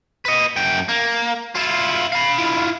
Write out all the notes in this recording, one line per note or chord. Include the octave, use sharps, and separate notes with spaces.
B4 D#5
F#2 G5
A#3
E4 F4
F5 B5
E4 F4